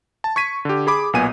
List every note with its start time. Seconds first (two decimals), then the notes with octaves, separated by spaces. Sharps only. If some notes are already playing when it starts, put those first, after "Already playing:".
0.24 A5
0.36 C#6 G#6 B6 D#7
0.65 D3 G4
0.87 G#4 B5 D6
1.13 B1 A#2 B3 G#5 D#7